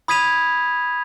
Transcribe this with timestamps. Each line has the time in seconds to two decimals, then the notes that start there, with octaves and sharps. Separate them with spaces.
0.08 B5 D#6 G#6 B6 D#7 F7